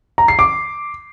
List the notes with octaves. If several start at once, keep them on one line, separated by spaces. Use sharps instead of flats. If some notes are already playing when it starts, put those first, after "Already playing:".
A#5
C7
D6